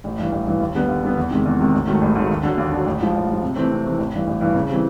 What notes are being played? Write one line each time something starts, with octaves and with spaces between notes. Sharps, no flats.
A1
G2 E3
A1
G2 E3
D#2
D3 G3 B3
D#2
D3 G3 B3
E2
C3 D#3 G#3
E2
C3 D#3 G#3
A1
G#2 D#3 F#3 A3
A1
G#2 D#3 F#3 A3
D#2
D3 F#3
D#2
D3 F#3
A1
G#2 F3
A1
G#2 F3
C3
E3 A3 C4
C3
E3 A3 C4
A1
G2 E3
A1
G2 E3
C#3
E3 G3 C4